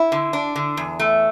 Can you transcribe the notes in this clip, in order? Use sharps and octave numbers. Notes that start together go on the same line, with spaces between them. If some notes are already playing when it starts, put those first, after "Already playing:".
Already playing: E4
D3
D4
D3
E2
A3